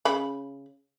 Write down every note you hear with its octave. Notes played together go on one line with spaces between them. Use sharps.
C#3 B5